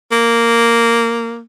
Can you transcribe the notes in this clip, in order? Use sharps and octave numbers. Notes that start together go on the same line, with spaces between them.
A#3